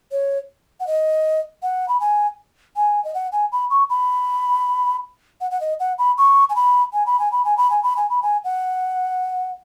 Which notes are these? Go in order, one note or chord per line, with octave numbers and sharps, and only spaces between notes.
C#5
F#5
D#5
F#5
B5
G#5
G#5
D#5
F#5
G#5
B5
C#6
B5
F#5
F#5
D#5
F#5
B5
C#6
G#5
B5
G#5
B5
G#5
B5
G#5
B5
G#5
B5
G#5
B5
G#5
F#5